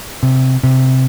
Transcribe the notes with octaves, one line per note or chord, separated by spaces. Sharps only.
C3
C3